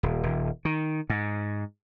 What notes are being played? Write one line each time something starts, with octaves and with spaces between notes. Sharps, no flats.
D#1
D#1
D#3
G#2